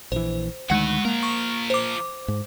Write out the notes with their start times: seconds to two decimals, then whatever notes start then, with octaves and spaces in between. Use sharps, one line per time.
0.12 A#1 E3 C5
0.70 D2 D#3 G#3 F#4 B4 F#5
1.05 F3 A#3 A#4
1.23 C#6
1.70 C5 D6
2.28 G#2